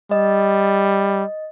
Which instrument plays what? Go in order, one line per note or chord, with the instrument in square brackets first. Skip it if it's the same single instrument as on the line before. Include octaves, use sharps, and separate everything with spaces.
[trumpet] G3 [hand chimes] D#5